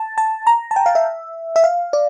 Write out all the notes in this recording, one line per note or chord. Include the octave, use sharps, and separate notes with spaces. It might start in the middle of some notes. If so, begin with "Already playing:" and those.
Already playing: A5
A5
A#5
A5
G5
F5
E5
E5
F5
D5